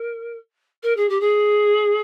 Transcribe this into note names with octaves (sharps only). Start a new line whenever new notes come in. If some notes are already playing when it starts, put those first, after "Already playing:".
Already playing: A#4
A#4
G#4
G4
G#4